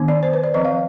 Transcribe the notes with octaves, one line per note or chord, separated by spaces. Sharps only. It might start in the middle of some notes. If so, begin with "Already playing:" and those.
Already playing: D#3 B3 D4
D5
C5
B4
D5
F3 C4 D#5
F5